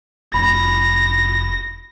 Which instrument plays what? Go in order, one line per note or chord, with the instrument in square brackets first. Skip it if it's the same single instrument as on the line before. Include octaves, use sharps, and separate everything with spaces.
[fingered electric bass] F1 [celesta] B5 [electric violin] A#6